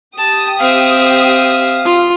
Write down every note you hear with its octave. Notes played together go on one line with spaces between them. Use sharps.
G4 A5 D#6
C4 E5 F5
F4